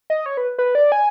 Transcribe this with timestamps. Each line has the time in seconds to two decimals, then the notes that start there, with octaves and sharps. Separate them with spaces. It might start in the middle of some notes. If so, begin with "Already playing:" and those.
0.10 D#5
0.26 C#5
0.37 B4
0.59 B4
0.75 D5
0.92 G#5